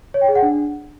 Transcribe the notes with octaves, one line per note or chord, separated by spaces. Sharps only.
C#5
G5
G#4
F#5
D4